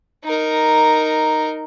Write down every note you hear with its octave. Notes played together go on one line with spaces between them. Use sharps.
D#4 A#4